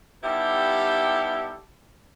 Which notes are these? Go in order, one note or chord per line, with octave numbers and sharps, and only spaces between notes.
G3 B3 D#4 E4 G4 A4